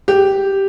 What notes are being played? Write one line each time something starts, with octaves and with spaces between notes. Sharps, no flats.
G4